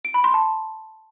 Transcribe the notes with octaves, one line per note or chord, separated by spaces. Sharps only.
D7
B5
C6
A5